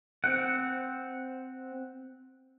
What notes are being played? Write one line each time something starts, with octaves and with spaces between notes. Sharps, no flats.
C4 F#5